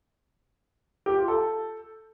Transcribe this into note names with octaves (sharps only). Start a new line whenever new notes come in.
G4
F4
A4